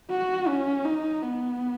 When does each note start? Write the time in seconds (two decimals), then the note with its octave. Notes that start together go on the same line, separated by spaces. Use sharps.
0.11 F#4
0.48 C#4
0.85 D#4
1.22 B3